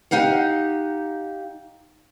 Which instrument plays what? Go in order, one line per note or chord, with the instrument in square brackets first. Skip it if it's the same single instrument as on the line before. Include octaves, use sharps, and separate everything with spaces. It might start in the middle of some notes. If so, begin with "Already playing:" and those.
[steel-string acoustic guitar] D#4 G4 F5 F#5